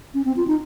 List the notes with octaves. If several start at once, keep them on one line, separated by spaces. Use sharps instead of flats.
C#4
C4
F4
D#4